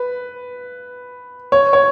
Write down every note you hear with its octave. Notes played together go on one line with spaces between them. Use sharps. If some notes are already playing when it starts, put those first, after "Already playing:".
Already playing: B4
C#5
C#5